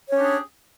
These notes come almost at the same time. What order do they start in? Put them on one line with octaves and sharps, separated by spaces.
C#5 C#4 G4 D4 G#4